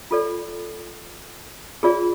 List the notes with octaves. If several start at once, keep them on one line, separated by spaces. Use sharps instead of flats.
F4 A4 D5
F4 G#4 D5